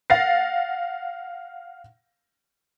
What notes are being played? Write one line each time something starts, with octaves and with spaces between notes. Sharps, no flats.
F5 F#5 A6 A#6 C7